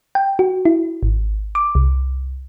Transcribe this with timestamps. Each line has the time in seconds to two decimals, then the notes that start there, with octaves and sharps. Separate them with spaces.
0.15 G5
0.39 F#4
0.65 E4
1.03 G#1
1.55 D6
1.75 C2